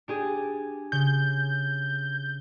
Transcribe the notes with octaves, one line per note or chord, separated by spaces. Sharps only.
D4 G4 G#4
C#3 G6